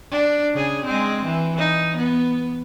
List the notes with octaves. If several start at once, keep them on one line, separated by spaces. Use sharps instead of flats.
D4
C#3 G#4
G#3 C4
E3
D#4
B3